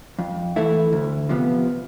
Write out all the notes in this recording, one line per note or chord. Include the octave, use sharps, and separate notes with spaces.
F2
E3 A3 E4
D2
C3 F3 B3